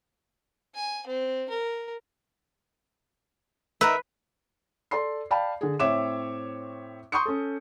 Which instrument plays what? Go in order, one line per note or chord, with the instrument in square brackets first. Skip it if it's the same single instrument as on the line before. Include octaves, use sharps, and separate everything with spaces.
[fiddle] G#5
C4
A#4
[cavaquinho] D#4 A#4 E5 [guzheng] B4
[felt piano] A4 D5 C6 C7
D5 F5 G5 A5 B5
D3 G#4
A2 C4 C#5 E5 D6 E7
C6 C#6 D#6 G6 C#7
C#4 A4